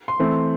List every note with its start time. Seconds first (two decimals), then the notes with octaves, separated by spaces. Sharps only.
0.08 C6
0.19 E3 A3 C4